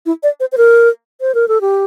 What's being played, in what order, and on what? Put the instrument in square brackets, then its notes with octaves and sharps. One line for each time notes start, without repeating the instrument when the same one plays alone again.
[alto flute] E4
D5
C5
C5
A#4
C5
A#4
A4
G4